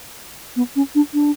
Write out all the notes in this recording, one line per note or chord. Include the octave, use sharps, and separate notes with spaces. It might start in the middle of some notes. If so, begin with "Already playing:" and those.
B3
C#4
D4
D4